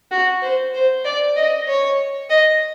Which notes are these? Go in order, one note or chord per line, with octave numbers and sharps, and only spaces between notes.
F#4
C5
C5
D5
D#5
C#5
D#5